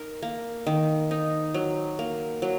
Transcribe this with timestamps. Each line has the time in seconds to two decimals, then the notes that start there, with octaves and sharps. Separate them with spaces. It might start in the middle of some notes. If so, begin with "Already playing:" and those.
Already playing: D#4 A#4
0.23 A#3
0.67 D#3
1.11 D#4
1.54 F#3
1.99 A#3
2.42 F#3